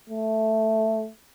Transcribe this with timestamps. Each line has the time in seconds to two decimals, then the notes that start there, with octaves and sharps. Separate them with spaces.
0.10 A3